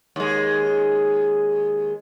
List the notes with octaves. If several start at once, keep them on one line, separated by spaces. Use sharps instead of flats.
D#2 G#3